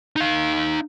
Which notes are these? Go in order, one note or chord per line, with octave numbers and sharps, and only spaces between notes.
D#4 F5